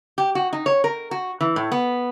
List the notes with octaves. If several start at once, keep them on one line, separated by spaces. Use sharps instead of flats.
G4
F#4
D#4
C#5
A#4
F#4
E3
A2
B3